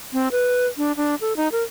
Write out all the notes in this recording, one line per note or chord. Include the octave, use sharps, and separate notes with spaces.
C4
B4
D4
D4
A4
D#4
A#4